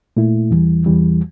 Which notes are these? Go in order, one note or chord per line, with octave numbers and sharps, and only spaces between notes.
A#2 A3 E4
E2 E3 G3
E2 E3 G3